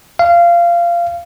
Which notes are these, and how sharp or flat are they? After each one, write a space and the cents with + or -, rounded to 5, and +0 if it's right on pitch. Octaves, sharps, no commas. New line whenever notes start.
F5 -20